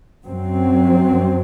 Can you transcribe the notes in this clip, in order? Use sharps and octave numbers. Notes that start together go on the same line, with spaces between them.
F#2 F#3 C4